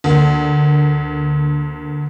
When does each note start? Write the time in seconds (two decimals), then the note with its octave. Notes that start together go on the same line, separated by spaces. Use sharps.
0.04 D2 A#3